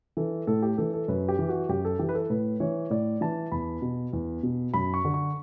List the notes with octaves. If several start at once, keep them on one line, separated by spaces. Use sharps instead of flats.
E3 A4
A2 A4
G4
E3 A4
A4
F#2 B4
G4
E3
F#4
F#2 G4
A4
E3 G4
B4
A4
A2 B4
E3 C#5
A2 D5
E3 A5
E2 B5
B2
E2
B2
F#2 B5
C#6
D3
C#6